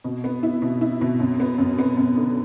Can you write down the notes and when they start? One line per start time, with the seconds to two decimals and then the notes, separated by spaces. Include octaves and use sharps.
0.04 B2
0.24 B3
0.43 E4
0.62 B2
0.81 E4
1.01 B2
1.20 F#2
1.40 B3
1.58 F#2
1.78 B3
1.97 F#2
2.17 D3